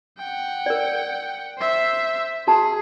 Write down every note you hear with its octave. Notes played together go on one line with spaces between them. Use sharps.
F#5 G5
A#4 D5
C5 E5
F#4 G#4 A5